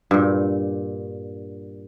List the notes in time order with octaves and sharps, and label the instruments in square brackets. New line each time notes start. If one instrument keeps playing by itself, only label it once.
[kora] G2 A#2